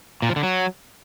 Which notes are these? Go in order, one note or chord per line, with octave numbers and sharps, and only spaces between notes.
A#2
F3
D3
F#3